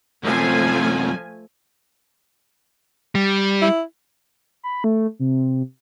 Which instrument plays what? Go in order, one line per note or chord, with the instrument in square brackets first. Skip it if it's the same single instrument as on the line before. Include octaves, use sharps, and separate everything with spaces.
[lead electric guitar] F#2 C3 [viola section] F3 A3 G#5
[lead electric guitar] G3
[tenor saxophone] E4
[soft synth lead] B5
A3
C3